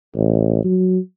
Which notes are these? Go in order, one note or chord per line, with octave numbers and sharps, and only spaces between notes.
A1
F#3